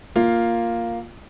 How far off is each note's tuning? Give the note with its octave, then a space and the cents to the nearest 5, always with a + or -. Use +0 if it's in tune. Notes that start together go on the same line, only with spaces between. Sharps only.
A#3 +0 F4 +0